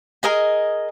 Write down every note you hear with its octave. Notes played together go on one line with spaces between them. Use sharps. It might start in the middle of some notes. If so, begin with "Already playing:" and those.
G#4 A#4 D#5 G#5